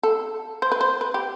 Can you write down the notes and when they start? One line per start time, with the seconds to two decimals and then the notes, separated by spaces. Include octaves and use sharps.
0.03 A4
0.62 C5
0.72 B4
0.81 C5
1.01 B4
1.14 G4